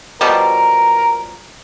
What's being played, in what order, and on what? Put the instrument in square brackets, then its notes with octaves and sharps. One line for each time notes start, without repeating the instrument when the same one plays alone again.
[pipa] B2 F3 G3 [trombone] A#4